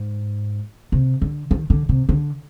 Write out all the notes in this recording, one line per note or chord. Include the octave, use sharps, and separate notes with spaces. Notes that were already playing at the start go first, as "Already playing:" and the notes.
Already playing: G#2
C3
D3
D#3
D3
C3
D3